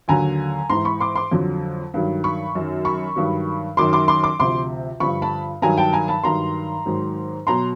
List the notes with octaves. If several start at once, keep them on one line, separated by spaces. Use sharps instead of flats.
D#2 D3 F#3 G#5 A#5
G#2 E3 A#5 C6
B5 C#6
C6 D6
C6 D6
F2 D3 F#3
G2 D#3 F#3
B5 C#6
F#2 D#3 F#3
B5 C#6
G2 D#3 F#3
F#2 D#3 F#3 C6 D6
C6 D6
C6 D6
C6 D6
D2 C3 F3 C6 D6
G2 D3 F3 B5 C#6
A5 B5
G2 D#3 F#3 G#5 A#5
G5 A5
G#5 A#5
A5 B5
G2 D#3 F#3 A#5 C6
G#2 D#3 F#3
B2 F#3 A#5 C6